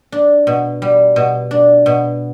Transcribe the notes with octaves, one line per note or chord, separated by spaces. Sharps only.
D4
B2
G3
B2
D4
B2